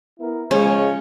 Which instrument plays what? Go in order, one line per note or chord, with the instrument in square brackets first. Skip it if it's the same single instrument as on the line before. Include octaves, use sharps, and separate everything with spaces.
[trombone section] B3 E4 A#4
[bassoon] C#3 [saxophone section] F3 C#5 [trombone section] G#3 [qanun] C#4